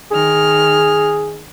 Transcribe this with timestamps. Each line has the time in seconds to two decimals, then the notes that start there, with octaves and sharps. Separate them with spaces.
0.11 D#3 G#4 F6